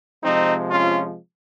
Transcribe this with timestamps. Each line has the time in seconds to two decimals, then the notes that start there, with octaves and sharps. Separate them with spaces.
0.23 C3 F3 G#3 C4 D#4
0.70 C#4 F4